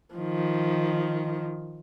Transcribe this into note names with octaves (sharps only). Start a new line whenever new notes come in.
D#3 F3